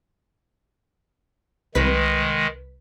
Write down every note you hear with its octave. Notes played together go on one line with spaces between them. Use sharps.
C2 D#3 G#3 B4 B6